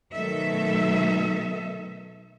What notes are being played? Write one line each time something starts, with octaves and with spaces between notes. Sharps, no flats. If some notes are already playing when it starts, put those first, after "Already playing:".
B2 D#3 F#3 A3 A4 E5